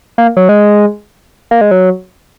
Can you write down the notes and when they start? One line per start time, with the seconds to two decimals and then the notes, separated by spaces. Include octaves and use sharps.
0.18 A#3
0.37 F#3
0.49 G#3
1.51 A#3
1.61 G#3
1.71 F#3